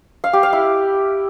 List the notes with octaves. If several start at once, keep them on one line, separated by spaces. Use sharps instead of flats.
F5
G4
F5
E4